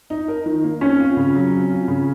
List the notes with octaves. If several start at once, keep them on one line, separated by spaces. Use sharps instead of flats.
D#4
A#4
D#3
A#3
C4 C#4
F4
C#3
F#3
C4
F4
C#3